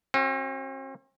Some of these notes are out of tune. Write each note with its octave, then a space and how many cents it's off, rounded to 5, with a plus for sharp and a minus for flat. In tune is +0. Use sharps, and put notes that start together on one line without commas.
C4 +45 F#4 +0